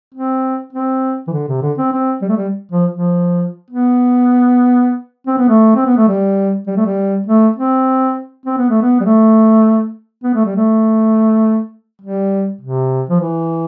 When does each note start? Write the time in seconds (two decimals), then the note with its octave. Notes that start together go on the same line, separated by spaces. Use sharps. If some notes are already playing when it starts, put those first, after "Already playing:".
0.14 C4
0.73 C4
1.27 E3
1.33 D3
1.48 C3
1.62 D3
1.78 C4
1.92 C4
2.21 G3
2.29 A3
2.36 G3
2.71 F3
2.91 F3
3.70 B3
5.27 C4
5.38 B3
5.49 A3
5.75 C4
5.86 B3
5.97 A3
6.08 G3
6.67 G3
6.76 A3
6.86 G3
7.27 A3
7.56 C4
8.45 C4
8.57 B3
8.69 A3
8.81 B3
9.00 G3
9.05 A3
10.23 B3
10.34 A3
10.45 G3
10.56 A3
12.02 G3
12.61 C3
13.09 F3
13.21 E3